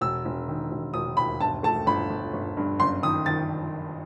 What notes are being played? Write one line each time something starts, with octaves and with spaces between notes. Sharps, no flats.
E1 E6
E1
D#3
E1
E1 D#6
D#2 B5
G1 A5
A3 A5
G1 B5
G1
G1
G2
F#1 C6
D#3 D#6
D#3 A6